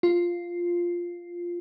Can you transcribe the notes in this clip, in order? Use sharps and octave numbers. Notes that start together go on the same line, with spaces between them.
F4